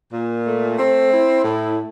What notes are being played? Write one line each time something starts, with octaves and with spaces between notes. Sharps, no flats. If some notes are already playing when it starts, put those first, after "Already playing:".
A#2
A3
C4
E4
A2